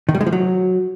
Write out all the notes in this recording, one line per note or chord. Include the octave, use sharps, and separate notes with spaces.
D#3
G3
G#3
F3
F#3